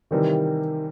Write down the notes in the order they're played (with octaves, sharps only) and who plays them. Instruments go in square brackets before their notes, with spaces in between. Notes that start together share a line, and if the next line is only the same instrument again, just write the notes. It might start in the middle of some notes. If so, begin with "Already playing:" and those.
[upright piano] C3 E3 G3 C4 [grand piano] D#3